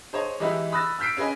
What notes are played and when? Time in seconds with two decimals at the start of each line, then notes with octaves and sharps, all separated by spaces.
0.13 G#4 C5 C#5 D#5
0.40 E3 G#3 D#4 E4 G4 B4
0.72 B5 D#6 E6 F#6 A6 A#6
0.99 E6 F6 G6 B6 C7 D7
1.17 C#4 G#4 B4 D#5 G#5